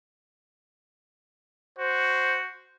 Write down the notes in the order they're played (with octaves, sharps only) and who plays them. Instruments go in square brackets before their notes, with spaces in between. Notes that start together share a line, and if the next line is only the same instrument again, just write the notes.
[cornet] F#4 [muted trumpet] C5